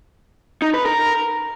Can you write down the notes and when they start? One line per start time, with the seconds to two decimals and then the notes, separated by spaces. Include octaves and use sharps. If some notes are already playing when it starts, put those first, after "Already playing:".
0.62 D#4
0.74 B4
0.86 A#4